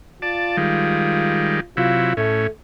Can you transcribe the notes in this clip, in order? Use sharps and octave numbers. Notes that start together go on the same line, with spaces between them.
F4 D5 A5
D#3 G3 G#3
C3 F#3 E4 F4
A2 A3 C#4